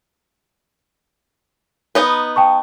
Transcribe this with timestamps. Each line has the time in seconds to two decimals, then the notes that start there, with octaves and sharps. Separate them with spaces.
1.95 B3 D#4 B4
2.36 G5 A5 C#6